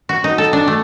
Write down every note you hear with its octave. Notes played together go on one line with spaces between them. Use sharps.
F#4
D#4
A4
D4
A3